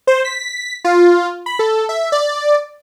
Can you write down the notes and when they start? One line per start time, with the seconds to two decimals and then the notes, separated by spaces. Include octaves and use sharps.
0.07 C5
0.25 B6
0.85 F4
1.46 B5
1.59 A4
1.89 E5
2.12 D5